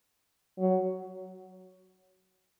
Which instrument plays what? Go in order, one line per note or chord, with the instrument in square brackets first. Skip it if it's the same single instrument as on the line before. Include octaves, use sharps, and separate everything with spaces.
[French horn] F#3